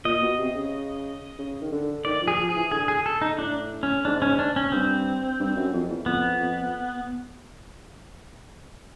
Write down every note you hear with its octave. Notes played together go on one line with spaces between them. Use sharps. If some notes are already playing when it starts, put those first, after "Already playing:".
A#2 D#5
B2
C3
C#3
C#3
D#3
D3
D#3 D5
F3
G#4
F3
G#4
E3
D3 G#4
G#4
A4
D#4
A2 D4
C#4
G#2 D4
C#4
D4
C#4
G2 C4
G2
F#2
F2
E2
F2 B3
F2